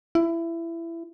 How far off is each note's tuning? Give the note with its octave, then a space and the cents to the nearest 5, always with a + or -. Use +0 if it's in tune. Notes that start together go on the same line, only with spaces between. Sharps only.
E4 +20